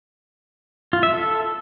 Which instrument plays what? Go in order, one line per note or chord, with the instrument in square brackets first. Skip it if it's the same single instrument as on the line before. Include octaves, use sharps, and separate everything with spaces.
[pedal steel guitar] F4
E5
A4